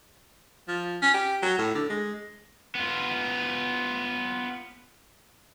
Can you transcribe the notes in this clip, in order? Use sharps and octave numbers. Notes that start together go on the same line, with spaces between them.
F3
C#4
G4
F#3
A2
D3
G#3
B3 F4